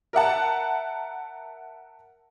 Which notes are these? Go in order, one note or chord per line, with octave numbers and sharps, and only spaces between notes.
A#4 E5 F#5 A5